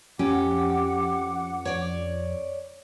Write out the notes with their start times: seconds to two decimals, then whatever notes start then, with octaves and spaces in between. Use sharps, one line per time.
0.19 F2 C#4 G4 F#5 D6
1.65 C#5 D5